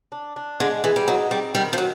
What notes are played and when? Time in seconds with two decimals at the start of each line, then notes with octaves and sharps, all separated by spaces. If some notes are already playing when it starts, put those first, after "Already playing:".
0.12 D4
0.36 D4
0.60 D3 G#3
0.84 E3 G#3
0.96 G3
1.08 F#3 D#4
1.30 G3 C4
1.55 D#3 G3
1.73 F3
1.78 F#3